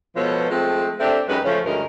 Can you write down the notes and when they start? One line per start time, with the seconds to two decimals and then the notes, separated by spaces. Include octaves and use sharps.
0.16 B2 F3 G#3 A4 B4 C#5
0.51 F3 G#3 A3 C4
1.00 A3 C4 D4 G4 A4
1.29 F#2 G#3 D#4 G4 B4
1.45 C#3 F3 A3 C#4
1.65 D2 G2 G#3 C#4 A#4